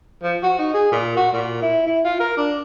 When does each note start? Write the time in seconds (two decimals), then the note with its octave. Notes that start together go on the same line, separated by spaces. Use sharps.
0.23 F3
0.43 F#4
0.59 D#4
0.74 G#4
0.91 A#2
1.17 F#4
1.33 A#2
1.62 E4
1.86 E4
2.04 F4
2.20 A#4
2.37 D4